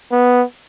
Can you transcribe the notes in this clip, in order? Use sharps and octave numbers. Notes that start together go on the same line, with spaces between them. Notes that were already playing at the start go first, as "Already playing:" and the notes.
B3